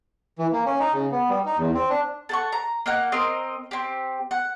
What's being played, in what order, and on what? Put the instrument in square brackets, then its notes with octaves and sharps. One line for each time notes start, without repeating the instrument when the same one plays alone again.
[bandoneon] E3
A#3
C#4
D#4
C#3
B3
G3
D#4
E2
C4
D4
[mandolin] A4 F#5 C#6
A#5
A#3 D#4 F#5
C4 A#4 D#5 C6
C4 G4
F#5